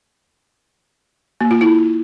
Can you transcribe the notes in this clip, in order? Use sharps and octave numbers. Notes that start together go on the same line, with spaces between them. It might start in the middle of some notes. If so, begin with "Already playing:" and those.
A#3
F4
E4